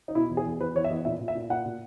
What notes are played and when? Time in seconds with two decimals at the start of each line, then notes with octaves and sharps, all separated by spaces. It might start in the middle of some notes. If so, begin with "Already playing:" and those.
0.08 D#4
0.15 B2 E4
0.30 E2
0.37 G#4
0.46 E2
0.60 E2 B4
0.75 E2 C#5
0.84 E5
0.90 E2 D#5
1.05 A#2 E5
1.20 A#2
1.28 E5
1.35 A#2
1.50 A#2 F#5
1.66 A#2